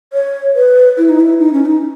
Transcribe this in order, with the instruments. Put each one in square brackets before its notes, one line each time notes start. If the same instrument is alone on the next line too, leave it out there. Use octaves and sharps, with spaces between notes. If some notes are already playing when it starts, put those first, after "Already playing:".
[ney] C#5
B4
E4
D#4
E4
D#4
C#4
D#4